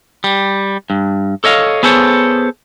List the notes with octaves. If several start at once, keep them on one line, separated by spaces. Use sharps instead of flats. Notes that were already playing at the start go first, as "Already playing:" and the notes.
G3
G2
A4 C#5 D#5 F5
B3 G#4 A4 C5 C#5